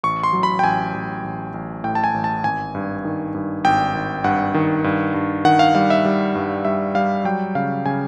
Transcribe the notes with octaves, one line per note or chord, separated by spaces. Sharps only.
A1 C#6
C6
F#3
B5
G5
A1 G#5
A1
A1
A1
A2 G5
A5
G#5
A1
A5
G#1 G#5
G2
D#3
G2
G#1 G5
G#1
G2 F#5
D#3
G2
G2
D#3 F#5
F5
G3 F5
E5
G3
G2
G3 E5
G3 F5
F#3 G5
C#3 F5
C#3 G#5